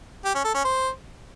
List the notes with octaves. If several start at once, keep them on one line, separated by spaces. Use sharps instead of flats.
G4
C#4
A4
C#4
C5